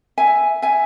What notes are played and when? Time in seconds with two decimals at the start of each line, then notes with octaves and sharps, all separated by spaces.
0.18 E5 G#5
0.62 E5 G#5